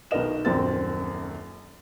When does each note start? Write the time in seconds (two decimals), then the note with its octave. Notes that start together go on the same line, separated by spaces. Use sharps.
0.11 B1 D#3 B3 A#4 D#5 E7
0.45 D#1 A#1 F#2 C4 A6